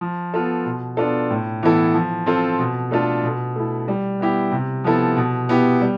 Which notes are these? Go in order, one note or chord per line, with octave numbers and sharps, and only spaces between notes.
F3
B3 F4 A4
B2
B3 D4 F4 A4
A2
E3 B3 E4 A4
F3
C4 F4 A4
B2
A3 D4 F4 A4
B2
A3 E4
G3
B3 E4 G4
C3
F3 B3 E4 A4
B2
B3 E4 G4
G3